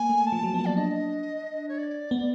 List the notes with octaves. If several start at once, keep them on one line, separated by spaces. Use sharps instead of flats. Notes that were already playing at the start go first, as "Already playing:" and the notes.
Already playing: A#3 G#5
A3
A5
F3
F#3
B3
A#3
D5
D4 D#5
C#5
D5
B3